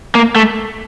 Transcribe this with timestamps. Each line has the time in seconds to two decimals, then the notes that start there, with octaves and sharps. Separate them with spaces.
0.15 A#3
0.35 A3